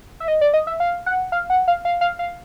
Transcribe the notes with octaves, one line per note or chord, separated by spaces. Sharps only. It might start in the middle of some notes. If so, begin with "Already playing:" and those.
E5
D#5
D5
D#5
E5
F5
F#5
F5
F#5
F5
F5
F5
F5